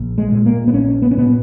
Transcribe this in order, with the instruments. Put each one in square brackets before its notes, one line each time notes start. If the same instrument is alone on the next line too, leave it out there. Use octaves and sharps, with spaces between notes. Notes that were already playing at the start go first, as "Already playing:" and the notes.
Already playing: [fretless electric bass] A#1
G#3
A#2
A#3
B3
A#1 C#4
B3
C#4
A#2 B3